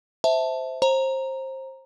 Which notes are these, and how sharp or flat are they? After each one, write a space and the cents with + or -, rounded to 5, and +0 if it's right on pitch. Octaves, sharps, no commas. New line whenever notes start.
C5 -10 E5 -10 A5 +0
C5 +25 A#5 +0